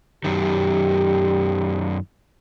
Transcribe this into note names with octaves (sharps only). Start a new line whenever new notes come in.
F#2 D#3 G4